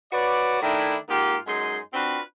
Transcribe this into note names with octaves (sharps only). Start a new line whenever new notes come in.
F#4 B4 C#5 D5
D#3 A3 D4 E4
G#2 A#3 F4 G4
F#2 G#3 D#4 G#5 C6
C4 D4 F4 F#4 B4